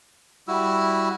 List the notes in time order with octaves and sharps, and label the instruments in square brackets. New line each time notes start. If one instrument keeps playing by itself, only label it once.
[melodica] G3 E4 F#4 E6